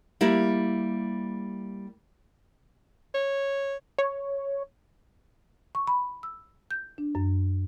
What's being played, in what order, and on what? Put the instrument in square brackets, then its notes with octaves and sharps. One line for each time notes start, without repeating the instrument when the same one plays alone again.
[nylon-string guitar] G3 A#3 E4
[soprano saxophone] C#5
[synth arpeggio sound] C#5
[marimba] C#6
B5
E6
G6
D4
F#2